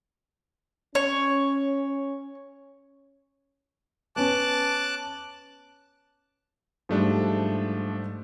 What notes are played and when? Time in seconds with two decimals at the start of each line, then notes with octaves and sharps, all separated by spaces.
0.95 C#4 C#5
4.16 B3 C#4 A5 D6 F#6
6.89 G#2 F3 G3 A3 D4